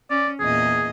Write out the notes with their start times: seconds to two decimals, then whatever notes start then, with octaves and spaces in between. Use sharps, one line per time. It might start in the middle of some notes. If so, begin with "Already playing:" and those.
0.10 C#4 D5
0.40 E2 A#2 G#4 D#5